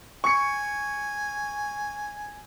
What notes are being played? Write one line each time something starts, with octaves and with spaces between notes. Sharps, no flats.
G#5 C#6 C#7